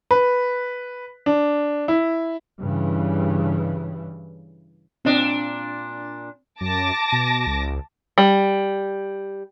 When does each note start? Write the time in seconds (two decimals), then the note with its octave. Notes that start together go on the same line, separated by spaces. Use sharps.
0.11 B4
1.26 D4
1.88 E4
2.61 G2 C#3 E3
5.05 A#2 C4 D4 D#5
6.61 F#2 A5 D6 A#6
7.12 B2
7.46 C#2
8.18 G3